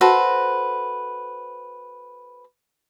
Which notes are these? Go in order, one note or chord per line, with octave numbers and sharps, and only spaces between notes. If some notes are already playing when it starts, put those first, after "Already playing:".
F#4 A4 B4 C5